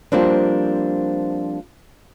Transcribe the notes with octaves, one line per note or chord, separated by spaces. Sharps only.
F3 G3 A#3 C4 D4